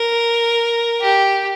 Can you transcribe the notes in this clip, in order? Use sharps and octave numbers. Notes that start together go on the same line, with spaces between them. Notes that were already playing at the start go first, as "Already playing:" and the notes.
Already playing: A#4
G4